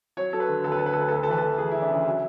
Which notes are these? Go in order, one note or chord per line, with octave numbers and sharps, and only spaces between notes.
F#3 C#5
F#3 A4
B4
D3
D2 A4
B4
D3 A4
B4
A4
D2
B4
A4
D2
B4
A4
E3 B4
E3 A4
E3 G#4
E3 E4
D4
C#3 E4
F#3